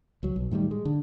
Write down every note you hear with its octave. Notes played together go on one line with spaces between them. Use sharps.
C#2 F#3
B1
A2 D#3 E3 G3
G#3
D3